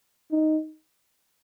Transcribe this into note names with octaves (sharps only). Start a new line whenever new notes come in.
D#4